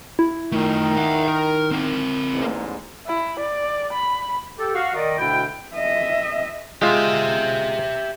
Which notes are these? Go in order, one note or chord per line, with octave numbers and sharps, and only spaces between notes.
E4
D#3 A3 F4
E5 F#5
A#4
C4 A#4
A1 E2 G#2
E4
D5
B5
G4 A4
F#4 F5
D#3 D5 D#5
D2 B2 D3 D4 E4 G5
D#5 E5
G#3 F4 G4 E5